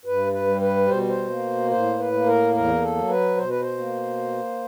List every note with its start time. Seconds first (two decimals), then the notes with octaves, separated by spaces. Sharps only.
0.05 G2 B4
0.32 B4
0.47 G3
0.61 B4
0.88 B2 C5
1.09 C5
1.30 A#3
1.71 A2 C5
1.99 B4
2.13 A#3
2.26 A#4
2.54 E2 A#4
2.81 A4
2.96 F#3
3.09 B4
3.37 B2 C5
3.49 B4
3.61 C5
3.78 A#3